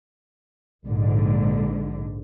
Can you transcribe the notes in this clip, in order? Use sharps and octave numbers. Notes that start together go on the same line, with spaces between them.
A#1 G#2 D3